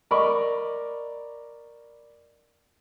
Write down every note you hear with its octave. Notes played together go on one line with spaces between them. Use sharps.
A#4 D5 D#5 B5 C#6